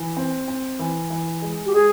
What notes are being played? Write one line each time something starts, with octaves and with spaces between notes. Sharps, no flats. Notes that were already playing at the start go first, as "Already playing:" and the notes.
Already playing: E3
C4
C4
E3
E3
G#3
G4
G#3 G#4